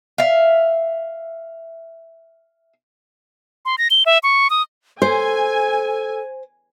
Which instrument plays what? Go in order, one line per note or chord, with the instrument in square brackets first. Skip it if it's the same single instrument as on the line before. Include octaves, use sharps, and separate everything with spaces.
[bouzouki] E5 F5
[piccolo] C6
A#6
G7
E5
C#6
D#6
[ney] A4 [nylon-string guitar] C5 [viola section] G#5